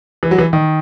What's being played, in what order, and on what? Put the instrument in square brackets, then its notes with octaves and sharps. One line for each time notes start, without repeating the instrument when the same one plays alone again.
[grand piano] E3
F#3
E3
D#3